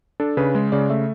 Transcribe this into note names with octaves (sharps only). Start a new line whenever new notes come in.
D4 A4
C#3 B4
G#3
C#3 D5
A3 E5